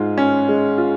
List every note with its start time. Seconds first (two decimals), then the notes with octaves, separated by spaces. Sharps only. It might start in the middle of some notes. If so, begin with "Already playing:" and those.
Already playing: G#2 G#3 F4
0.18 C#4
0.49 G#3
0.78 F4